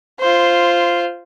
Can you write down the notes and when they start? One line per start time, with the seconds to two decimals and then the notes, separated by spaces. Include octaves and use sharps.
0.20 F4 C5